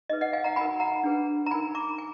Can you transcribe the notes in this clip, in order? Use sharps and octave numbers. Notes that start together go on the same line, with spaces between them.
D#4 G#4 B4 D#5
D#5 F#5
F5 G#5
F#5 A#5
D#4 F#4 A#4 G#5 B5
F#5 A#5
D4 G#4 B4
A#5
D#4 A#4 G#5 B5
A#5 D6
G#5